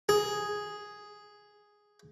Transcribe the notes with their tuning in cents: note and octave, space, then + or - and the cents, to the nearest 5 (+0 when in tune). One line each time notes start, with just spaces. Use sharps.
G#4 +0